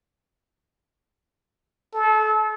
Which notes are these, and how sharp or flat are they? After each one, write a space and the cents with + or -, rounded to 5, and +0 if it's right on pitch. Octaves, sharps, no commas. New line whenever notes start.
A4 -30